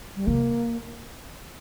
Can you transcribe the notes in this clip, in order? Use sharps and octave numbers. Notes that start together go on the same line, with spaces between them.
G3
C3 A#3